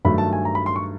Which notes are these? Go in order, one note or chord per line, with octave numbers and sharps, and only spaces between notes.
G2 D#3 F#3 A3 B5
A5
G#5
A#5
B5
C6
C#6